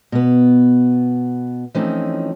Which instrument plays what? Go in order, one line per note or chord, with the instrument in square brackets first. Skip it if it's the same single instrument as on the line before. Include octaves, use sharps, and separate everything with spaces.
[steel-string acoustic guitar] B2 B3
E3 F3 A3 C4 C#4 D#4